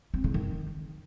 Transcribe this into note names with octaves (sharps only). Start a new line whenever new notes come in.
C4
C#3
D#3